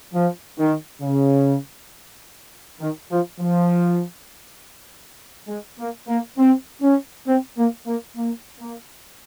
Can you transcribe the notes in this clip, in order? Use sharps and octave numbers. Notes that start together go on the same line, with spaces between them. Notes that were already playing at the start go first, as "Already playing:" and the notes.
F3
D#3
C#3
D#3
F3
F3
G#3
A#3
A#3
C4
C#4
C4
A#3
A#3
A#3
A#3